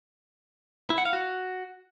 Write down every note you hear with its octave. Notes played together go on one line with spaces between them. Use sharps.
E4
F#5
F5
F#4